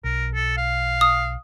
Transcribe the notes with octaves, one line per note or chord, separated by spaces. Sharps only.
B1 A#4
A4
F5
D#6